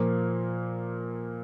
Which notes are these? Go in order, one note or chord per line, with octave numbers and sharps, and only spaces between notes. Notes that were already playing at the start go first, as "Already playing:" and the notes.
Already playing: A#2 F3 A#3